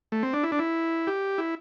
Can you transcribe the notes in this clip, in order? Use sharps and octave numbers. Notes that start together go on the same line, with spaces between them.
A3
C4
D4
E4
D4
E4
G4
E4